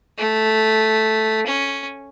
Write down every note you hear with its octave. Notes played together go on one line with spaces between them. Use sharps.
A3
C#4